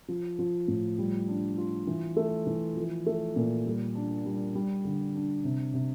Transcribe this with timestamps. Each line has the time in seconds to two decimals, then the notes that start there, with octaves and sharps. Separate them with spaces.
0.08 F3
0.39 F3
0.68 A2
0.98 G3
1.28 D4
1.57 F4
1.87 E3
2.16 A3
2.47 E3
2.76 F3
3.06 A3
3.36 A#2
3.66 G3
3.95 D4
4.25 G3
4.55 G3
4.84 D3
5.15 D4
5.44 C3
5.74 C3